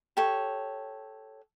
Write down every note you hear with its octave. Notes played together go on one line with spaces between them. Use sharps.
G4 A4 C#5